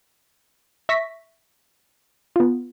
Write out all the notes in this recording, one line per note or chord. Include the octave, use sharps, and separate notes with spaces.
E5 C#6 A#6 B6
B3 F4